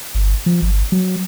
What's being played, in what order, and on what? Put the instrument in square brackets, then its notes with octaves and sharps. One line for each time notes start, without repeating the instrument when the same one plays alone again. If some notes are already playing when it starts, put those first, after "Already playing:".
[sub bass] G1
F3
G1
F#3